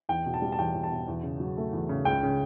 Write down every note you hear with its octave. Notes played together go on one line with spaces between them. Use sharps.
E2 G5
B2
A5
G3
A5
E2 G5
E2
A5
B2
E2
C#3
F#3
A3
E2
C#3
C#2 G5
C#3